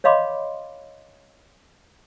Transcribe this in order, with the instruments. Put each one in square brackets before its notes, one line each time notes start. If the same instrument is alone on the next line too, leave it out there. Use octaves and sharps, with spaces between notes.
[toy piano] C#5 D#5 F5 B5 C6 D6